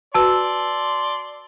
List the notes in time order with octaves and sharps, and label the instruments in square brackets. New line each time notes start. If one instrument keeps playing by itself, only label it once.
[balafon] F#4 B4 [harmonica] D5 C6 [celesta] A5 E6